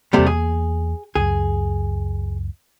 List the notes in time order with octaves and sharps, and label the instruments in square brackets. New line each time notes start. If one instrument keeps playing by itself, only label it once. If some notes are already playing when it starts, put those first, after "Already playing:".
[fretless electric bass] E2 A#3 [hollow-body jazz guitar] C3 G3 A3
[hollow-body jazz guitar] G#4
[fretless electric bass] C#2 F#2 [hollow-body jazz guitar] G#4